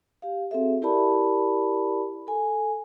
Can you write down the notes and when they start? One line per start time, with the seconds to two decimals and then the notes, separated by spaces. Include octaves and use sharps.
0.22 G4 F5
0.51 C4 F#4 G#4 A4 E5
0.82 E4 G4 A#4 D5 A5 B5
2.27 A4 G#5